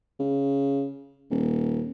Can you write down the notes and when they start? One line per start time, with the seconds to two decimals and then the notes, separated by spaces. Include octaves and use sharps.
0.20 C#3
1.31 D#1